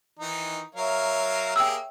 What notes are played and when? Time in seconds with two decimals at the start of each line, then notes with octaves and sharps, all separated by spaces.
0.19 D#3 E3 D#4
0.75 F#3 A#4 C#5 E5 F5
1.56 A#3 G4 G#4 G5 E6